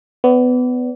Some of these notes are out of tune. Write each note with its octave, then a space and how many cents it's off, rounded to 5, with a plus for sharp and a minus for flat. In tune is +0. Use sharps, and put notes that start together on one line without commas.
B3 +20 D5 -30